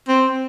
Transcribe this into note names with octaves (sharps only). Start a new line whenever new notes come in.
C4